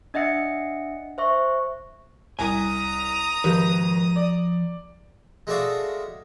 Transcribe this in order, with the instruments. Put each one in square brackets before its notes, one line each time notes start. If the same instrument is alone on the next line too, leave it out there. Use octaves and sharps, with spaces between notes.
[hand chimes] D4 D#5 E5 F#5 C#7
C5 E5 C#6
[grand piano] C2 [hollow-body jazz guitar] G#5 [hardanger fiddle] A#5 D#6
[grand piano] G#1 [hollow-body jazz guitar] F3 G4 B4
[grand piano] D5
[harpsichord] G#3 A3 F#4 D5 E5 F5